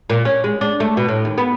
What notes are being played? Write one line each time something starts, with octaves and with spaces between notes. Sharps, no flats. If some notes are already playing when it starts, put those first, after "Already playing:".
A#2
C#4
G#3
D4
A3
B2
A2
D#2
B3